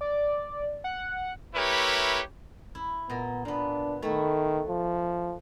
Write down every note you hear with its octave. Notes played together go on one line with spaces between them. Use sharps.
D5
F#5
A3 E4 G4 A#4 B4 C#5
E4
A#2 B3 D#5
A#2 B3 D4
D#3 A3 E4
F3